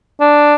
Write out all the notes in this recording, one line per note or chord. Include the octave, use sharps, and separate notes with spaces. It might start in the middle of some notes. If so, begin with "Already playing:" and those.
D4